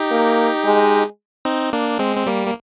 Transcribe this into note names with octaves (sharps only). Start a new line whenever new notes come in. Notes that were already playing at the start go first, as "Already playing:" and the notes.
Already playing: D#4 G4
A#3
G#3
C4 D#4
A#3 D4
G#3 C4
C4
G3 A#3
A#3